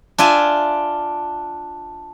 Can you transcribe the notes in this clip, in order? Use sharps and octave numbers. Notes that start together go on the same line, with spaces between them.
D4 F4 E5 G#5